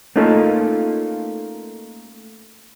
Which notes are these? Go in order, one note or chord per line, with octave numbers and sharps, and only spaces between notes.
A3 A#3 C#4 D#4 F4 A4